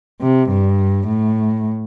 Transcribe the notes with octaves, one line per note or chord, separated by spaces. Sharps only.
C3
G2
A2